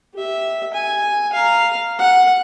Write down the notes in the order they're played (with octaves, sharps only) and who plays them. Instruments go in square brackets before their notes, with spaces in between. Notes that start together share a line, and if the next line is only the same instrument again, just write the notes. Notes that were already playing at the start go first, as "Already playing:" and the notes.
[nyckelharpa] G4 E5
G#5
F5 A#5
F#5